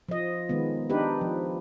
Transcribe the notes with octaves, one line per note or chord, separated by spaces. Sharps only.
F3 D#5
D#3 G#3 B3
D4 D#4 G4 B4
F3